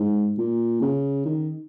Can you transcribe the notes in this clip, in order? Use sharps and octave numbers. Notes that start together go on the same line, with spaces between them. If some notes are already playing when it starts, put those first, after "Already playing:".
Already playing: G#2
A#2
C#3
D#3